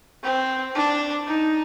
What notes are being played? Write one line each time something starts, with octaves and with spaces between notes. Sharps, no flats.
C4
D4
D#4